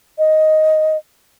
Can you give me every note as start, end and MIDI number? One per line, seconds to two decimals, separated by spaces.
0.19 0.97 75